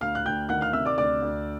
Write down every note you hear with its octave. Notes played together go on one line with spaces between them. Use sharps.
D2 F5 F6
F#6
D2 G5 G6
D#3 F#5 F#6
F5 F6
C3 E5 E6
D5 D6
D2 D5 D6
D2